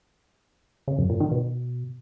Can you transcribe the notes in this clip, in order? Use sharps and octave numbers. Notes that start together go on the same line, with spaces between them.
C#3
F#2
A#2
D#3
B2